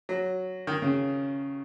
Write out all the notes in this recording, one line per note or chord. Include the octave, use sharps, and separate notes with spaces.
F#3
D#3
C#3